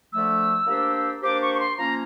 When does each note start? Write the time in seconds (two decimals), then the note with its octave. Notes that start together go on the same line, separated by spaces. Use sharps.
0.13 D3 F3 A3 E6
0.67 A#3 D4 G4 C5
1.22 A#3 D4 G4 C5 D6
1.42 C#6
1.55 C#6
1.60 C6
1.78 F3 A#3 C#4 A#5